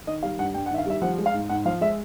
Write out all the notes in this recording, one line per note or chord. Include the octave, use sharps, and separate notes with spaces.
D#3 D#5
G3 F5
G2 F#5
G2 G5
F#5
D#3 E5
F5
G3 E5
F3 F#5
G#3
F5
G#2
G#2 F#5
F3 F5
G#3 E5